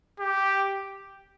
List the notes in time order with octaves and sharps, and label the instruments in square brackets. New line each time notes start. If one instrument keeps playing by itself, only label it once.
[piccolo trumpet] G4